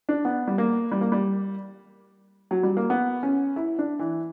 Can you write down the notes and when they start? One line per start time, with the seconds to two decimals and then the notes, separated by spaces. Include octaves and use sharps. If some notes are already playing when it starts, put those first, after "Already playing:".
0.09 D4
0.25 B3
0.48 G3
0.58 A#3
0.92 G3
1.01 A#3
1.12 G3
2.51 F#3
2.63 G3
2.77 A#3
2.90 B3
3.23 C#4
3.56 E4
3.79 D4
3.99 E3